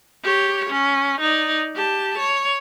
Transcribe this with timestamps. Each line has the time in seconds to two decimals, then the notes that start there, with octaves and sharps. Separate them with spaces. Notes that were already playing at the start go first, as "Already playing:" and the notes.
0.23 G4 C#5
0.69 C#4
1.20 D#4 D5
1.74 G4 A5
2.18 C#5